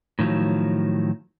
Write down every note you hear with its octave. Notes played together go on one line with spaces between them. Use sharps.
A2 D#3 F3 F#3